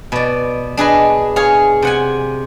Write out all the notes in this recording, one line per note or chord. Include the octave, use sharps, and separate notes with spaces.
B2 D5
D4 G#4 B4 D#5
G#4 C#5 F5
C3 F#5 G#5